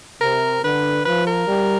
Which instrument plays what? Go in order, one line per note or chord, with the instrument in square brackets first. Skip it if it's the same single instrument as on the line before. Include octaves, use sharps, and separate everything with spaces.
[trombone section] C3 [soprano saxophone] A#4
[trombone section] D3 [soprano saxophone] B4
[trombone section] F3 [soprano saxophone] B4
[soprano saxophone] A#4
[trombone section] G3